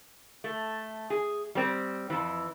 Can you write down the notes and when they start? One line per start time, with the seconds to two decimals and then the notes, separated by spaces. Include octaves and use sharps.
0.44 A3
1.10 G#4
1.55 G3 C4
2.10 F2 E3